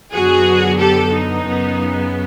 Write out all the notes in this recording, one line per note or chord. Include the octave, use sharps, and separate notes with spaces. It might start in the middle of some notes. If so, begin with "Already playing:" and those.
F#2 D3 F#3 B3 F#4 G#4
G4 A4
D#4
F#2 C#3 F#3 B3